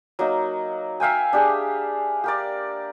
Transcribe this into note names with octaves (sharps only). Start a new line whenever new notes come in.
F#3 A#3 D#4
E5 F5 G5 G#5
D4 G4 G#4
G4 A#4 D5